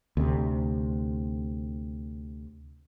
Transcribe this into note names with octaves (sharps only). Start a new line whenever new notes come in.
D2 C3